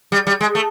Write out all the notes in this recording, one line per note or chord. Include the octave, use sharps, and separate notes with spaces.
G3
G3
G#3
A3